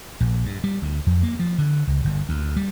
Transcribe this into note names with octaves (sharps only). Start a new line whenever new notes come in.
A#1
G2
G3
D2
F2
A#3
F3
D3
C#2
G1
D2
G3